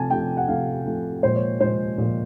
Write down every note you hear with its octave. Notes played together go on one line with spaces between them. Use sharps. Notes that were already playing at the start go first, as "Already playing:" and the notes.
Already playing: C3 F3 A3 G#5 A5
C3 F3 A3 G5
F#5
C3 F3 A3 F5
C3 F3 A3
A#2 F3 G#3 C5
C#5
A#2 F3 G#3 C5
A#2 F3 G#3